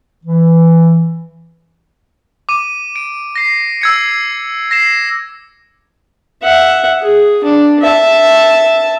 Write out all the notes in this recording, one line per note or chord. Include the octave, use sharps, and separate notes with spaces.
E3
D6 D#7
D7
A#6 C7
E6 G#6 C#7
A#6 C7 E7
E5 F#5
G#4
D4
E5 A5